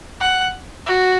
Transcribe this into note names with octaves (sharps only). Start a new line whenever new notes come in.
F#5
F#4